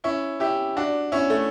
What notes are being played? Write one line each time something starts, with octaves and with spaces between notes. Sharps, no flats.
C#4 E4
E4 G4
D4 F#4
C#4 E4
A3